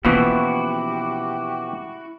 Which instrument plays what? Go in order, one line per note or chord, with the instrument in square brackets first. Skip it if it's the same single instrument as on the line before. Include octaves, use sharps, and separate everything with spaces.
[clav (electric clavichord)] B2 E3 F3 [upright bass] A#3 C#4 [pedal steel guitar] E4 F#4 [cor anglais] G4